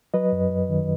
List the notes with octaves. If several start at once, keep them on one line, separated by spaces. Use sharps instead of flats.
F#3 B4 D#5
F#2
F#2
D#3